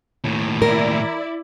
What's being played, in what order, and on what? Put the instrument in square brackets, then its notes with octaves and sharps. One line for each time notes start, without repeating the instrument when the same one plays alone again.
[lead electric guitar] D#2 A2
[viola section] E4 D5 [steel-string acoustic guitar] A#4